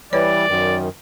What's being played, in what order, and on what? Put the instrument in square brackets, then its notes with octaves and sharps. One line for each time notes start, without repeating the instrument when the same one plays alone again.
[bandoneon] E3 G3 [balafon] B4 C#5 [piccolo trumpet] D5
[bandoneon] F#2 D#3